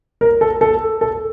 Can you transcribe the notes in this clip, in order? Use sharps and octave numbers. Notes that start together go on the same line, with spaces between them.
A#4
A4
A4
A4